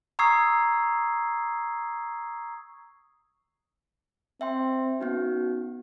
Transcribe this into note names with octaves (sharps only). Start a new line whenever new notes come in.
A#5 C#6 D#6 E6 G#6 C7
C4 E5 G5 C6
B3 C#4 D#4 F#4